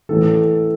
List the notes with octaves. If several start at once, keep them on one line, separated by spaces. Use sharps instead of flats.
A2 E3 A3 A4